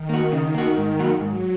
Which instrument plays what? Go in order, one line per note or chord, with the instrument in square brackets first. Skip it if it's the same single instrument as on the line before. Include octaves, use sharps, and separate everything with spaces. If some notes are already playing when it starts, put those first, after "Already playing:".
Already playing: [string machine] D#3
[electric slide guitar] A#3 F#4
C#3
A#3 F#4
G#2
F#3 A#3 F#4
[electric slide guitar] G#2 [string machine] F#3